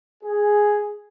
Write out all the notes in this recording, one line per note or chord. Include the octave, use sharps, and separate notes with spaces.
G#4